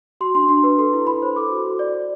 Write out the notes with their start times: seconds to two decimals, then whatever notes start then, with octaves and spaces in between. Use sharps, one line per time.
0.21 F#4 C6
0.35 D4 C6
0.49 D4 C6
0.63 B4 C6
0.78 A4 C6
0.93 E4
1.07 E4 B5
1.22 C5
1.36 A4 D6
1.50 F#4
1.66 F#4
1.79 D5
1.94 C5